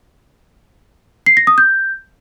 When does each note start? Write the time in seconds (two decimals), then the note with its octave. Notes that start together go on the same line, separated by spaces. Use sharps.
1.26 C7
1.37 A#6
1.47 D#6
1.58 G6